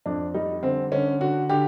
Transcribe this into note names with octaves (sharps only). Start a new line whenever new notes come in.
F2 D4
G3 D#4
D3 C4
D3 C#4
D3 F#4
D3 G4